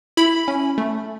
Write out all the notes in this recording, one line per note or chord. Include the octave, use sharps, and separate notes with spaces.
E4 B5
C#4
A3